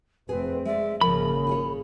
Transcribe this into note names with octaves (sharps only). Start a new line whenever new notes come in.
F1 A3 C4 G#4 B4
G#3 D5 E5
G#1 C#3 F3 A#3 A#4 B5
F4 G#4 C#5